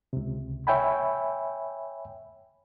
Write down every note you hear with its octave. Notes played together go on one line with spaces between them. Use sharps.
C#2 C3
C#5 E5 G5 G#5 B5